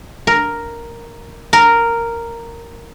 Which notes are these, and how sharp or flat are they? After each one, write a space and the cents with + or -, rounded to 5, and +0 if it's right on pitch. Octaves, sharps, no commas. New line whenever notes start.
A#4 +0
A#4 -5